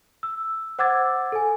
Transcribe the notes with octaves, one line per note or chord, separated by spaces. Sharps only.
E6
C5 F#5 D6 E6 G#6 A6
A4 G#5